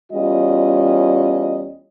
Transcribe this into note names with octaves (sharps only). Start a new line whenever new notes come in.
E2 G3 C#4 F4 D#5